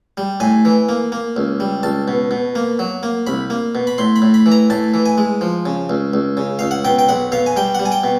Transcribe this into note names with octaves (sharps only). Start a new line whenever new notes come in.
G3
A2 G#5
E3
A#3
A#3
C#2
G3
C#2 A5
B2
B2
A#3
F#3
A#3
C2 B5
A#3
B2
B5
A2 C6
B5
A2
B5
E3
A#5
A2 A5
E3
G#5
G#3
F3
C#3
C#2
C#2
C#3
C#2 F5
F#5
B2 G5
G5
B1 F#5
B2 F5
G#5
G3 G5
G3 F#5
G#5
G5
B2